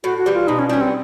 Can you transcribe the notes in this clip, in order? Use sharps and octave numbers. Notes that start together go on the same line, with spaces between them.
A2 F#4
F#4
E3 G3
F4
B2 D#4
C#4
G3 B3 C#4
C4